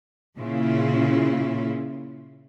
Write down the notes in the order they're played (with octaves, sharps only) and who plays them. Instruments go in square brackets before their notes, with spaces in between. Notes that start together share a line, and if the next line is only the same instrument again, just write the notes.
[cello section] A#2 C#3 C#4 E4 F4